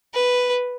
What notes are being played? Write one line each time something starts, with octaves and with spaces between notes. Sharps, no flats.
B4